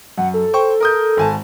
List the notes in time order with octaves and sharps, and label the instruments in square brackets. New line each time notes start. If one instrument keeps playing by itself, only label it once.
[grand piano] F#2 [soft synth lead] F#5
[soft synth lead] A4
[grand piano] C5 G5 C#6
A#4 D#6 G6
G#1 G#5 A5